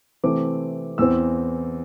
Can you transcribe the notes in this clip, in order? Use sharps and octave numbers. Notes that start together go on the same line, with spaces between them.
C3 E3 A3 C4 D6
E2 E3 C4 E6